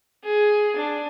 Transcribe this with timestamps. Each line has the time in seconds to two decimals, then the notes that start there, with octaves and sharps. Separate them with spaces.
0.24 G#4
0.76 D4